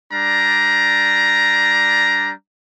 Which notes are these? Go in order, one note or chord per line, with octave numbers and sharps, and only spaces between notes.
G3 D4 A#5